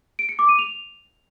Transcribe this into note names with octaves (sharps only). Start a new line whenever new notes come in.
D7
C#7
D6
D#7
F7